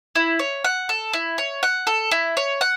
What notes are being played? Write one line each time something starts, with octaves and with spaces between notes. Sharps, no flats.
E4
C#5
F#5
A4
E4
C#5
F#5
A4
E4
C#5
F#5